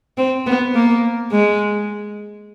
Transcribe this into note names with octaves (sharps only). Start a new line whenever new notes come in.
C4
B3
A#3
G#3